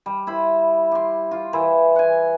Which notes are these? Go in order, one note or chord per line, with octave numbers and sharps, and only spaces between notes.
G3
E4 C5 B5
G4 C6
F4
E3 E4 C5
F#5 G#5